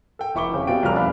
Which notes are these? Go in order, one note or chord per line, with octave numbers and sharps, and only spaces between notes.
A4 G5
F1 E4 C#6 D6 G7
C#3 C4 G4
B2 C4 F4 D5 G5 D7
C2 F2 C#3 A#5 F6 F7
E2 A#3 D4 F5 B5 F#6